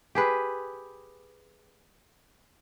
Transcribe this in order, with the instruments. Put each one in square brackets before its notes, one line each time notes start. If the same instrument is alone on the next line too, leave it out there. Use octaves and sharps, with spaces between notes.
[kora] G4 G#4 B4